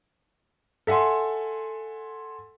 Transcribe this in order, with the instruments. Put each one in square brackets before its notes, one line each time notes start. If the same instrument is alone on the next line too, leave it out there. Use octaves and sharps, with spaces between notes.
[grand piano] A4 E5 F#5 G#5 C6